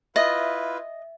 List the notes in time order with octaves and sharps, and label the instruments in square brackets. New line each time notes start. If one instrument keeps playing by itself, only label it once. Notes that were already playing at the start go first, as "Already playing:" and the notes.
[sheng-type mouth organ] E4 F4 B4 [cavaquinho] D#5 [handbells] E5